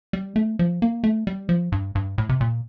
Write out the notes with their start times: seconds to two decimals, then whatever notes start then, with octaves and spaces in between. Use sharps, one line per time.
0.13 G3
0.36 A3
0.59 F3
0.82 A#3
1.04 A3
1.27 G3
1.49 F3
1.72 G2
1.95 G2
2.18 A2
2.29 C3
2.41 A#2